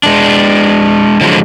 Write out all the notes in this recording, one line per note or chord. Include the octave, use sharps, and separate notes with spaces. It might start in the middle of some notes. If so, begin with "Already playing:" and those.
G#3 D4
D3 F3 F#3 G#3